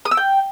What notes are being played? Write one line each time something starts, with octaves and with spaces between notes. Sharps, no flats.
D#6
E6
G5